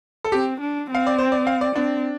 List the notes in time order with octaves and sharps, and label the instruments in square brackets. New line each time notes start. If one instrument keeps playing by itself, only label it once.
[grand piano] A4
[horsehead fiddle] C4 [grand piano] G4
[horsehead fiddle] D4
[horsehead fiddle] C4 [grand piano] F5
[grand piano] D5
C5
D5
F5
D5
[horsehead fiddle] C4 [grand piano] D4